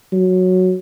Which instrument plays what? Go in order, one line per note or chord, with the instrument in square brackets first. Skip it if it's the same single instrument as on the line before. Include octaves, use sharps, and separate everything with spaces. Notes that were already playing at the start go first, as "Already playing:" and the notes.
[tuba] F#3